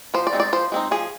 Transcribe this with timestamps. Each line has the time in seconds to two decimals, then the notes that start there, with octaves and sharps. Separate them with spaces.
0.14 F3 C5
0.27 D5
0.33 G#3 C4 D#4
0.40 D5
0.52 F3 C5
0.72 G#3 C4 D#4
0.91 F3 G#4